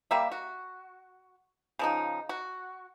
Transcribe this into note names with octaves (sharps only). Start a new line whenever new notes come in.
G3 A#3 E5
F#4
C#3 F3 D#4
F#4